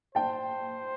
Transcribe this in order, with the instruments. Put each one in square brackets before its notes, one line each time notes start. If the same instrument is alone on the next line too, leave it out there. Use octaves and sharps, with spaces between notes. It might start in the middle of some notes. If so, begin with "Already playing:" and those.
[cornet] C5 [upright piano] G5 A5